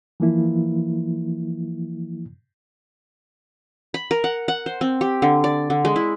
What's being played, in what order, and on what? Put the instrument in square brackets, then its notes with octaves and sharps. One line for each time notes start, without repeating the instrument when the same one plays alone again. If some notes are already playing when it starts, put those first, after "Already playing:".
[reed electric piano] E3 F3 A#3 E4
[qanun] B5
A#4
F#5
F#5
C5
C4
G4
D3
D5
D3
G#3
E4